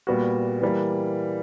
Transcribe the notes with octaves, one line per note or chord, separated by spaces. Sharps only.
A#2 G3 B3 F#4
E3 G3 A#3